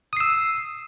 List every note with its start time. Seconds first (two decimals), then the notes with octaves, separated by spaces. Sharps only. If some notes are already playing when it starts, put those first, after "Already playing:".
0.13 D#6
0.17 C7
0.20 E6